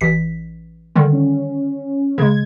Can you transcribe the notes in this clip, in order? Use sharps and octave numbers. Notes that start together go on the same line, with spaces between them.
A1 B6
D3 D#3 G3
C#4
C#3 G#3 G#6